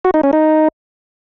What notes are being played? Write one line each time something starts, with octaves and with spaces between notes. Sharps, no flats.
F#4
D#4
C#4
D#4